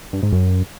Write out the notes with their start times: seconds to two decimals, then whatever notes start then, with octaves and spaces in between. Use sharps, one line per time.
0.13 G2
0.23 G#2
0.33 F#2